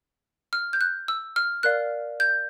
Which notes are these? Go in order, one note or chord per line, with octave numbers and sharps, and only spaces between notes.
F6
G6
F#6
E6
F6
A#4 D5 F5 F#6
G6